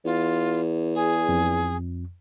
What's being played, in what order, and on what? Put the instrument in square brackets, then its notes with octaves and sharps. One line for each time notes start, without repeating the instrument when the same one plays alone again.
[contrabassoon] E2 [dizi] F4
[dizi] G#4
[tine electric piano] F2